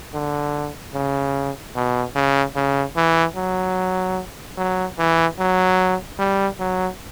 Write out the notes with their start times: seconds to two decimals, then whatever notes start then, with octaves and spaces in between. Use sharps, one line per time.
0.14 D3
0.94 C#3
1.76 B2
2.15 C#3
2.56 C#3
2.96 E3
3.36 F#3
4.57 F#3
4.98 E3
5.39 F#3
6.19 G3
6.60 F#3